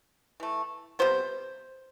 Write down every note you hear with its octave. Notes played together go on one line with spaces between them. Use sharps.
E3 A3
C3 G3 B3 C5